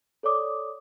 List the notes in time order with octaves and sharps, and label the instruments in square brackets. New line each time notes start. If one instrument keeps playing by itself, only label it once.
[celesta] A4 C#5 D5 D6 D#6